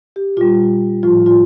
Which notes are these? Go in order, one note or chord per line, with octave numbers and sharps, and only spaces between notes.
G4
A#2 G3 F4
A2 F3 F4
F4